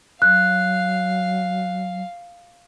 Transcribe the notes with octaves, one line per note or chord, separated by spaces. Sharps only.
F#3 F5 F#6